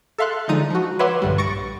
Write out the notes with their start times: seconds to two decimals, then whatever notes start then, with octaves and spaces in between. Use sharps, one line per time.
0.18 A4 E5 F5 C6 F#6
0.48 D3 F3 G#3 D#4 A#5 D#7
0.70 F3 F#4
0.99 B4 C#5 E5 F#5 C6 D6
1.22 A#1 G2 D3 G3
1.38 C#6 A6 A#6 C#7 D7